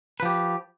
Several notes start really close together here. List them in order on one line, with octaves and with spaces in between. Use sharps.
B4 F3 G4